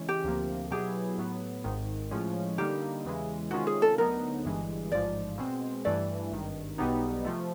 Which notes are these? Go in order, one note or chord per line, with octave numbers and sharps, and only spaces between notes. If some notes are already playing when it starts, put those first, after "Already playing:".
Already playing: C#3 E3 G#3 C#4
G4
D2 C3 F3 A#3
B2 F#3 B3 E4 G4 G#4
A2 F#3 B3
G#1 G#2 D#3
A2 F3 G#3 C#4
D3 G3 A#3 D#4 G4
E2 C#3 E3 G#3
C3 D#3 G#3 C#4 F4 F#4
G#4
A4
D2 D3 F#3 B3 D#4 A#4
G1 G2 E3 G#3
A1 G#2 F3 D5
B2 G#3 C4
G2 E3 A3 D5
G#1 G2 D#3
B1 B2 G3 B3 D#4
C3 F3 A3